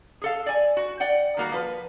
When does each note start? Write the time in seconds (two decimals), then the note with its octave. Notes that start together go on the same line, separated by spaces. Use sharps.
0.21 G#4 A4 F5
0.46 D5 G#5
0.77 F#4
1.00 D5 F#5 G5
1.37 D#3 G3 A#3 F#4
1.52 F3 B4